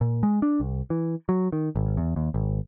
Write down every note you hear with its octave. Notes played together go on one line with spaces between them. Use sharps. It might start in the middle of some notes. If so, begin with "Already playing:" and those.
A#2
G#3
D4
C2
E3
F#3
D#3
G#1
E2
D#2
G#1